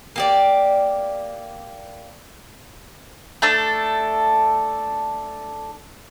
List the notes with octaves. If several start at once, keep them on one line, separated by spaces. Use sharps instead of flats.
A#3 G4 D5
A3 D4 A4